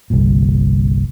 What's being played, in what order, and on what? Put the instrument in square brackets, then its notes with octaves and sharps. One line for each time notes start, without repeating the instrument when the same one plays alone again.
[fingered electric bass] G1 C2 A#2